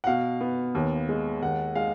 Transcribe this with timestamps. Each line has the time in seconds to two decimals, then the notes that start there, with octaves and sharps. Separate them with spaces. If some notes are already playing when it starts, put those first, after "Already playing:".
0.04 F#5
0.07 B2 F5
0.41 B3
0.75 D#2
1.09 G#3
1.42 D#2 F#5
1.75 G#3 F5